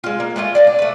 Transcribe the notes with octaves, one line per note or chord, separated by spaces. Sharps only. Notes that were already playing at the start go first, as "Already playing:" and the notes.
G#3 F4
A#3
G#3 A3 C#4 F4
D5 F5 G#5
D4
A3 B4